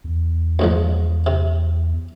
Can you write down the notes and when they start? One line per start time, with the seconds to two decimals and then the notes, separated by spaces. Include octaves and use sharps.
0.04 E2
0.59 D2 G#2 F3
1.26 C3